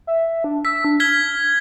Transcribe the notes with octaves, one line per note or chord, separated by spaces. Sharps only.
E5
D4
E6 B6
D4
F6 G#6 B6 G7